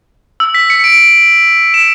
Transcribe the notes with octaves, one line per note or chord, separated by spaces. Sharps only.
E6
B6
C#7
D7
E7